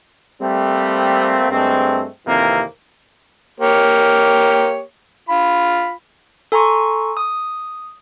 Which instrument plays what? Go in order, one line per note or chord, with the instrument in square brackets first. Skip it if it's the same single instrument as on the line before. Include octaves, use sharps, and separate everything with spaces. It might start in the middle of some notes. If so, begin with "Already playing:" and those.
[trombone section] G3 A3 A#3 C4
G2 G#3 A3 C4
F2 C3 D#3 E3 A#3
[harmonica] A#3 G4 C#5
F4 B5
[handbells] A4 G#5 A#5 C6 C#6
D#6